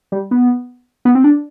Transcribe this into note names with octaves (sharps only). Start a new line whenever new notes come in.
G3
B3
B3
C4
D4